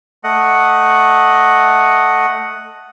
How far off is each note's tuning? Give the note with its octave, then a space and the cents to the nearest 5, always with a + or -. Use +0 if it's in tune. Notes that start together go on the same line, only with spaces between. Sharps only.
A3 +0 D#5 +0 F#5 +0